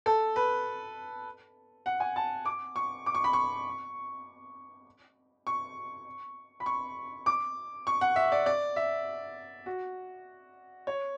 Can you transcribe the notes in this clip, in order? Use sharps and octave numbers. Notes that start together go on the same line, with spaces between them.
A4
B4
F#5
G#5
A5
D6
C#6
D6
C#6
B5
C#6
C#6
B5
C#6
D6
C#6
F#5
E5
D5
D5
E5
F#4
C#5